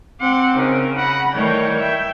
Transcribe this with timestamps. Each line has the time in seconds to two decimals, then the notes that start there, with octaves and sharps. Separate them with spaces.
0.21 C4 F#5 C6 D6
0.56 C#3 D#4 A#4
0.97 F#5 B5 A#6
1.35 D#3 E3 G3 A3 A#4 C#5 G5
1.80 E5 G5